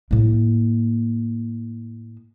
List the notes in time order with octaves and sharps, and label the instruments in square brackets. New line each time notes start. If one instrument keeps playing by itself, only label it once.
[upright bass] A2 A#3